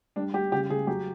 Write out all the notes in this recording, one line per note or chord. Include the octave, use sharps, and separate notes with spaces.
G3 D4
G3 G4
C#3 G4
C#3 G#4
F#3 G4